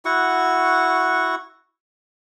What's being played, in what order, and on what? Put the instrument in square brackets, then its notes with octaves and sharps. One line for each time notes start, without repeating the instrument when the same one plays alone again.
[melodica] E4 F#4 F#5 C#6